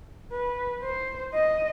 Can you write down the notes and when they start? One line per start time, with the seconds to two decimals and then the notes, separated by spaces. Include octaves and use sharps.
0.32 B4
0.83 C5
1.34 D#5